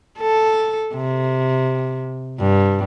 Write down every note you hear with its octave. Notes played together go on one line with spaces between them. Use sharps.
A4
C3
G2